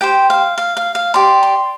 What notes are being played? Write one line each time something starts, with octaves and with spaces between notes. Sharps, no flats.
G4 C5 G5
F5
F5
F5
F5
G4 D5 C6
C6